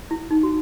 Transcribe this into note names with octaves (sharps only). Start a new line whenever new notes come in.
E4
D#4
F#4